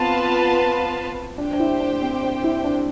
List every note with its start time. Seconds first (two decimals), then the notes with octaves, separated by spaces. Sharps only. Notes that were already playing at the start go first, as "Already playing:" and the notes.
Already playing: B3 C4 F4 B4 F5 A5
1.38 D4 G4 C5 G5
1.53 D4
1.60 E4
1.80 D4
2.02 C4
2.23 D4
2.44 E4
2.64 D4